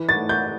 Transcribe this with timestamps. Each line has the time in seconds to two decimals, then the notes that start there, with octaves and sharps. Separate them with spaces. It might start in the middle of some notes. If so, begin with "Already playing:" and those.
Already playing: E3
0.09 A6
0.16 A3
0.29 G6